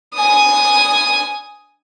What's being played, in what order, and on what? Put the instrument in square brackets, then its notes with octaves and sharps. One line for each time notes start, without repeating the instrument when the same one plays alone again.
[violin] G#5 D#6